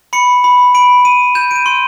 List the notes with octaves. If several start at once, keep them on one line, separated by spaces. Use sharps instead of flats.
B5 C#7
B5
B5 D7
B5 D#7
G6 E7
D7
D#7
C6